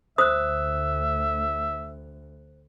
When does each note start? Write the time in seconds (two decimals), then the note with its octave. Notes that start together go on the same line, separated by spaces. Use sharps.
0.18 D2 C5 E5 D#6 F#6